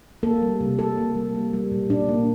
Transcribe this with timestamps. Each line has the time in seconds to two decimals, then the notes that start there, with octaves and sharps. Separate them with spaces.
0.23 A#3 A4
0.42 G3
0.61 C3
0.78 C3 A4
0.97 A#3
1.16 G3
1.35 A#3
1.53 G3
1.72 A#2
1.90 A#2 D4
2.09 A#3